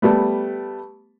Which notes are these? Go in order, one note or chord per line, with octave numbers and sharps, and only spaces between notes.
G3 A3 B3